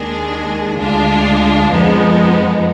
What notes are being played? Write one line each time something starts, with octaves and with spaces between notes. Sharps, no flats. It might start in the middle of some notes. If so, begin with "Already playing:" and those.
Already playing: D#2 D#3 G#3 D4 G#4
D2 D3 G#3 D4 F4
F2 F3 G#3 B3 D#4